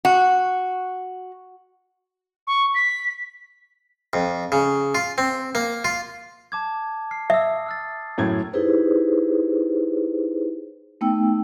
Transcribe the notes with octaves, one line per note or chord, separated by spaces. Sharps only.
F#4
C#6
B6
F2
C#3
F4
C4
A#3
F4
A5 D6 G#6
F6 C7
E5 D#6 E6
E6 F6 A6
F#2 A2 G#6
D#4 E4 G4 G#4 B4 C5
A3 B3 D#4 G5 E6